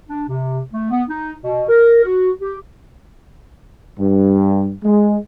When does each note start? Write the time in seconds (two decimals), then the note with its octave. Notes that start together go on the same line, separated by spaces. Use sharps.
0.09 D4
0.28 C3
0.73 A3
0.91 B3
1.09 D#4
1.43 B2
1.69 A#4
2.04 F#4
2.41 G4
3.98 G2
4.84 G#3